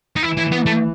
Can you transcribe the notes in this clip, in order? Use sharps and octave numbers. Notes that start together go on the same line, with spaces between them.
D#4
E3 E4
E4
B3
A3